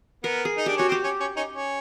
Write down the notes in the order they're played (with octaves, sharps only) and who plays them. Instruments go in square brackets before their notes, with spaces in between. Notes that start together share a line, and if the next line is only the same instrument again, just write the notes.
[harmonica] B3 [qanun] A#4
[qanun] G#4
[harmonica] D#4
[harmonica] D4 [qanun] G4
[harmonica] C#4 [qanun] F#4
[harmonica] C4
[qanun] G4
[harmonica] C#4
C#4
C#4 D#4
C#4